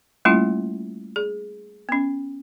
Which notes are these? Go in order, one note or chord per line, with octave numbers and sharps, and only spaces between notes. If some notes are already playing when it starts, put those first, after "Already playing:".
G3 A3 A#3 C#4 E4 F4
G#4
B3 C#4